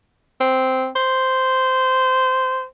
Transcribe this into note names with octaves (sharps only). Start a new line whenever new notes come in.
C4
C5